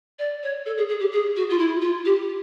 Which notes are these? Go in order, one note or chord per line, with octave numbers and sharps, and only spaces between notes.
D5
C#5
A4
G#4
G#4
G4
G#4
F#4
F4
E4
F4
G4